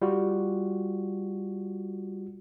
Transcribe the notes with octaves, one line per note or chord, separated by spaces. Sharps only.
G3 F4 F#4